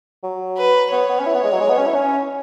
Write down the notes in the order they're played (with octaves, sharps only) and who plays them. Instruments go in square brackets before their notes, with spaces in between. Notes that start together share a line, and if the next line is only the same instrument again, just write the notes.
[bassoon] F#3
[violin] B4
[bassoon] B3 [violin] C#5
[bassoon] B3
C#4
E4
B3
G#3
F#3
G#3
B3
C#4
E4
C#4